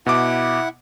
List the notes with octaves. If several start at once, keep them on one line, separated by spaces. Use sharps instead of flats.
B2 E4 F#5 D6